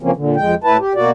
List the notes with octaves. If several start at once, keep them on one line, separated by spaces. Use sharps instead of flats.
C#3 E3 F3 A#3 C4 C#4
A#2 D3
F2 G#3 G5
A2 E4 B4 A5
G4
B2 A#3 F#4 D5